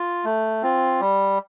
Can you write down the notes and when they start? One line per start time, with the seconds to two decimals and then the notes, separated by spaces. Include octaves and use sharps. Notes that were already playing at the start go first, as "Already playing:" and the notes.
Already playing: F4
0.25 A3
0.63 C4 F4
1.01 G3